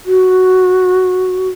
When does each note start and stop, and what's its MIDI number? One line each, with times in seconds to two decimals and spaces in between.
0.06 1.48 66